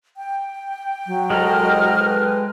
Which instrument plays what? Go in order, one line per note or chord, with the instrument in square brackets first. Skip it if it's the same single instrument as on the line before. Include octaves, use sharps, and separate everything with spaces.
[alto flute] G5
[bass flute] F#3
[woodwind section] C2 D#5 F6 [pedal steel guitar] G#3 A4 A#5
[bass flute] B4